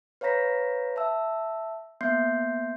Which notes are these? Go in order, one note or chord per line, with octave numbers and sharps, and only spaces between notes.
B4 C#5 F5 A#5 A#6 B6
E5 A5 E6
A#3 B3 E5 C6 G6 C7